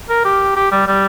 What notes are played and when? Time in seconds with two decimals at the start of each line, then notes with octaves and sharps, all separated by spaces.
0.09 A#4
0.25 G4
0.56 G4
0.72 G3
0.87 G3